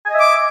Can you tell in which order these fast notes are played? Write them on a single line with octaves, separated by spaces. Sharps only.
G#5 D#5 E5 D6